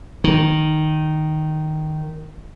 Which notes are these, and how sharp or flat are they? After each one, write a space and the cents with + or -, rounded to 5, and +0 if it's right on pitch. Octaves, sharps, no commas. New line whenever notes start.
D#3 -5